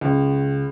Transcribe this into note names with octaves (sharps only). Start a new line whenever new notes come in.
C#2